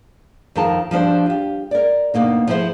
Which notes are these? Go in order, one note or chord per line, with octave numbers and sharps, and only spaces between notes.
F2 D#3 F4 A#4 A5
F3 G3 D4 C5
F4 G4
A#4 D5
D2 B2 A#3 D#4
F3 G#3 A3 E4 C5